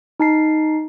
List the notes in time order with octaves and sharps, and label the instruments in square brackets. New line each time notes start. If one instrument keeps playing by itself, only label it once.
[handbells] D#4 A5 C7